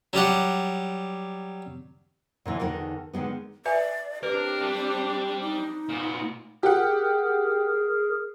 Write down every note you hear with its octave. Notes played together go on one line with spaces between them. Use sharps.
F#3 G3 D5 F#5
A#2 D3 E3
E2 D3 D#3 D#4 A#4
D3 D#3 G#3 B3
B4 D5 E5 G#5
C4 D4 G4 A#4 B4
G3
D#4
A#2 B3
G4 G#4 A#4 F#5